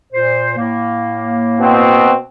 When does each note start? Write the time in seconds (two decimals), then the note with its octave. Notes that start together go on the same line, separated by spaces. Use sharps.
0.13 A#2 C5
0.57 A2 A#3
1.60 B2 C4